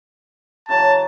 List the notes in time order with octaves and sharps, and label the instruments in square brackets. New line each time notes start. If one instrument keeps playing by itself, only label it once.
[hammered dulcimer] C#3 E3 F#3 [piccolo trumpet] A5